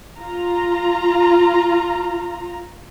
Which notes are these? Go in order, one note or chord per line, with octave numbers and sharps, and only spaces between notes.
F4 A#5